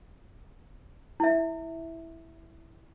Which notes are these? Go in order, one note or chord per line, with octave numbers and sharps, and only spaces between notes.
E4 E5